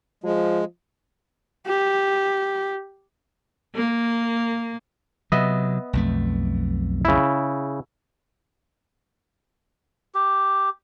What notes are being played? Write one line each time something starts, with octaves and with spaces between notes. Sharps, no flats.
F3 G#3
G4
A#3
C3 F#3 B3 D#5 E5
B1 F2 A3
C#3 E4
G4